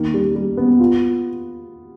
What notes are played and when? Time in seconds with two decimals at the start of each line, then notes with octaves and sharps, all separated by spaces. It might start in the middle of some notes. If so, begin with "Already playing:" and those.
Already playing: D#3 A#3
0.14 G3
0.35 G3
0.57 B3
0.79 F4